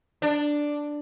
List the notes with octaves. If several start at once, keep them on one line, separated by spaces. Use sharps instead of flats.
D4